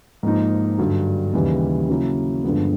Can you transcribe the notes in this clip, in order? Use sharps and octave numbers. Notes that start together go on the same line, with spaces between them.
G#2 F3 A#3 D#4
G2 D3 F#3
D#2 C#3 E3 G3
C#3 F#3 A#3 C#4 E4
G2 D3 F3 G#3 B3